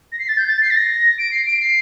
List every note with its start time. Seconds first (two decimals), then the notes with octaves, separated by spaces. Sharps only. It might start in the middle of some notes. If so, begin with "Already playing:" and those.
0.12 A#6
0.19 C7
0.28 A6
0.37 G6
0.47 A6
0.61 C7
0.70 A6
0.75 A#6
1.18 D7
1.31 C7
1.46 D7
1.60 C7